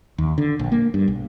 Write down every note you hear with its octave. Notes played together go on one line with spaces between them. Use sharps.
D#2
D3
A#1
A#3
G2
B1